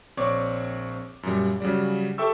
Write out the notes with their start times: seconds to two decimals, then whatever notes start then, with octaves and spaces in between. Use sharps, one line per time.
0.17 A#1 C4 C#5 D5 C#6 D6
1.23 F#2 A#2 G3
1.60 C#3 F#3 G3 D5
2.18 G4 A4 E5 G5 C#6 E6